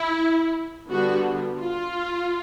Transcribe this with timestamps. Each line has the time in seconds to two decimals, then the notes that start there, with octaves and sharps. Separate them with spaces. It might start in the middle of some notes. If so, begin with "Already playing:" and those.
Already playing: E4
0.89 D3 G3 B3 D4 F#4
1.59 F4